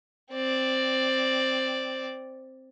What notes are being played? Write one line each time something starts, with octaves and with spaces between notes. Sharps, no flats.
C4 D5